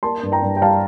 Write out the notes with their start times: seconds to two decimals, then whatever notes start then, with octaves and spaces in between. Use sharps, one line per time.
0.03 A#3 A5 C6
0.23 G2
0.32 G5 A#5
0.42 G2
0.57 G5
0.62 G3 F5 A5